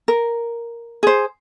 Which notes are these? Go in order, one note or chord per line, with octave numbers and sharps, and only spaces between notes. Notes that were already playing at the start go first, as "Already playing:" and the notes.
A#4
G#4 C5